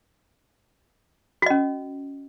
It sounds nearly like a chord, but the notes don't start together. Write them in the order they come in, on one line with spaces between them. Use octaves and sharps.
F#4 D#5 C#4